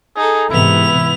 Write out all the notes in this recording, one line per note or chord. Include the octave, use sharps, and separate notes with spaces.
D#4 G#4 A4
G#2 C3 E3 B3 E4 F7